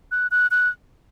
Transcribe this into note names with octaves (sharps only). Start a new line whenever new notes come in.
F#6
F#6
F#6